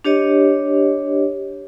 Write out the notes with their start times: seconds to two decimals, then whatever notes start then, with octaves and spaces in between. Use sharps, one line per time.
0.05 D4 G4 C#5 D#5